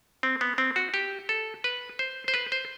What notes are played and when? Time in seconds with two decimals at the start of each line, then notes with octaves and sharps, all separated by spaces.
0.23 C4
0.41 B3
0.58 C4
0.76 F#4
0.94 G4
1.29 A4
1.64 B4
1.99 C5
2.28 C5
2.34 B4
2.52 C5